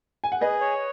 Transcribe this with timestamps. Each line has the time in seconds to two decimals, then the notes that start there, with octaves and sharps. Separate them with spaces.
0.24 G#5
0.32 F#5
0.40 G#4 B4 D#5
0.61 C#5